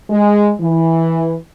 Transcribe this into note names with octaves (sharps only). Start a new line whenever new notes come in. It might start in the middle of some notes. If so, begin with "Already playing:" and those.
G#3
E3